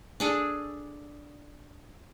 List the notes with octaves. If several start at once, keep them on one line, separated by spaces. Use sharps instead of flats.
D4 G#4 A4